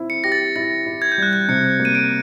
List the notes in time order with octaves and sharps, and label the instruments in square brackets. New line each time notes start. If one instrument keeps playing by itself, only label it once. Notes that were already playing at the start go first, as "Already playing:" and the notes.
Already playing: [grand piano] C4 E4
[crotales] C#7
[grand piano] G4 [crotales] A#6
[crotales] A6
[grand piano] E4 [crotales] A6
[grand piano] E4
[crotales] G#6
G6
[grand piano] G3 [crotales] F#6
[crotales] G6
[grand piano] C3 [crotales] C#7
[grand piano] A#3
[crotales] D#7
D7